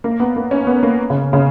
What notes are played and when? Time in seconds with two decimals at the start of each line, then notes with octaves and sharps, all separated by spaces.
0.04 A#3
0.20 B3
0.36 A#3
0.51 C#4
0.67 B3
0.83 A#3
1.10 C#3
1.33 C#3